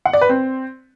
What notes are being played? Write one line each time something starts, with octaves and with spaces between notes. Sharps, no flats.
F#5
D5
B4
C4